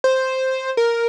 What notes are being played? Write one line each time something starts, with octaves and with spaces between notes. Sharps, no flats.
C5
A#4